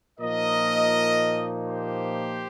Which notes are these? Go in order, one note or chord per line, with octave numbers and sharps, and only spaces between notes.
A#2 F3 A#3 D#4 A#4 D#5
G4 C5